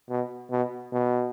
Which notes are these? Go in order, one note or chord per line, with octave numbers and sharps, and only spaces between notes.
B2
B2
B2